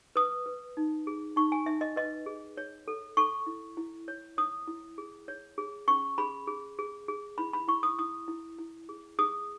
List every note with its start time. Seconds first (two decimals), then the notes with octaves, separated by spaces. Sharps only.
0.16 B4 D#6
0.46 B4
0.77 D#4
1.07 G#4
1.36 D#4 C#6
1.52 G#5
1.66 D#4 E5
1.81 D#5
1.96 B4 D#5
2.26 G#4
2.57 C#5
2.88 A4
3.17 A4 C#6
3.47 E4
3.77 E4
4.08 C#5
4.37 C#5 D#6
4.67 E4
4.98 G#4
5.28 C#5
5.58 G#4
5.88 C#4 C#6
6.18 G#4 B5
6.47 G#4
6.79 G#4
7.08 G#4
7.38 E4 B5
7.53 B5
7.68 E4 C#6
7.83 D#6
7.99 E4 D#6
8.28 E4
8.58 E4
8.89 G#4
9.19 G#4 D#6